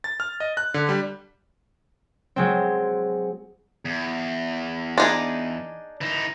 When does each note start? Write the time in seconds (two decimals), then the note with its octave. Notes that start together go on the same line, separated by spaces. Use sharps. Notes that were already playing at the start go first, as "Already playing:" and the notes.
0.04 A6
0.20 F6
0.40 D#5
0.57 F#6
0.74 D3
0.89 G3
2.36 F#3 G#3 C4
3.85 E2
4.98 D4 D#4 G#4
6.01 E3 D#4